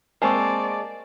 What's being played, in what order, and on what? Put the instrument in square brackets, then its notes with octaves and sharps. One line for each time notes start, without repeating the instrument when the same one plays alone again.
[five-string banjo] G#3 A#3 C4 [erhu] D5 [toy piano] G#5 [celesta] A5 C#6